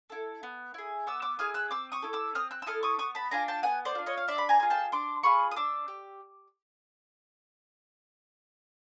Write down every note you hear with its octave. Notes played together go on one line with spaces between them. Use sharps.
E4 A4
B3
E4 G#4
B3 D6 E6
D6 E6
E4 G#4 D#6 F6
E6 F#6
C4 D6 E6
C#6 D#6
E4 A4
D6 E6
C4 D#6 F6
E6 F#6
E6
E4 A4 D#6 F6
C#6 D#6
B3 C#6 D#6
A5 B5
D4 F4 G#5 A#5
G5 A5
B3 F#5 G#5
C5 D5
D4 F4
C#5 D#5
F5
D4 D5 E5
B5
G#5 A#5
F4 G#4
G5 A5
D4 C6 D6
F4 G#4 B5 C#6
D#6
D4 D6 E6
G4